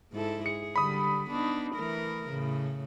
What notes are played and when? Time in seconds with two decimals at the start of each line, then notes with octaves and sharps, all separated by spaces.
0.13 G#2 E4 A4
0.46 G#4 C#7
0.76 D3 G3 B5 D#6
1.29 B3 D4 D#4
1.75 E3 A3 A#4
2.29 A2 C#3